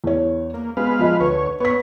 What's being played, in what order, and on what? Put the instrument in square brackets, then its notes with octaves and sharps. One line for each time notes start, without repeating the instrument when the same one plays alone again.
[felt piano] E2 C#5
[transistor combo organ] A#3
[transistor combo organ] G#3 B4 F5 [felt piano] B3
[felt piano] F3 F4 D#5
[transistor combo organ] D2 C#5 [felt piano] B4
[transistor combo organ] B3 C#5 [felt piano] B4 B6